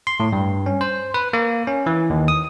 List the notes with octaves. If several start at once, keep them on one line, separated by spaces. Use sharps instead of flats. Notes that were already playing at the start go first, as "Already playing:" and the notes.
C6
A2
G2
C#4
C5
B4
A#3
C#4
E3
D#2
D#6